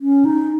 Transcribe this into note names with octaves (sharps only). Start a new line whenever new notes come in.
C#4
D#4